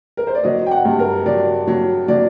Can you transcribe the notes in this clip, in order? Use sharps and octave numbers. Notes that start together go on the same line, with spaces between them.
A#4
C5
D5
F#3 D#5
G5
F#5
G2
A#4
F#3 D5
F#3
F#3 D5